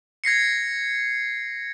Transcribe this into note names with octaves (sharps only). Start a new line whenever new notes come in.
G#6 A#6 C7 C#7